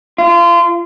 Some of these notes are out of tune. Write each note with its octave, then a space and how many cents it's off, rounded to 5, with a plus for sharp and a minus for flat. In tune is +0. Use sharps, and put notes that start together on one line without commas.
F4 -30